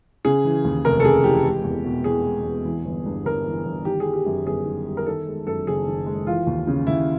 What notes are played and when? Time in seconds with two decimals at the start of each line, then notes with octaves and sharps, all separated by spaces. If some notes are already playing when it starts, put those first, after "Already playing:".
0.25 C#3 G#4
0.45 E3
0.65 D#2
0.84 F1 A#4
1.00 A4
1.04 C#3 G#4
1.24 E3 G4
1.45 G#3
1.64 E2
1.84 B2
2.04 E2 G#4
2.24 G#3
2.44 E2
2.65 E3
2.85 G1
3.06 G2
3.26 G1 A#4
3.46 E3
3.66 G1
3.85 D#3 G4
4.00 G#4
4.05 G3
4.14 G4
4.26 F#2
4.45 G1 G#4
4.66 D#3
4.86 G3
4.97 A#4
5.06 D#3 A4
5.27 G#3
5.46 F#2 A4
5.67 F#1 G#4
5.87 D#3
6.06 G#3
6.27 E3 F4
6.47 D#2
6.67 C#3
6.87 D#2 E4